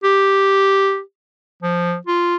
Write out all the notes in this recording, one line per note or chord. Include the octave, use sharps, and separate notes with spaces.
G4
F3
F4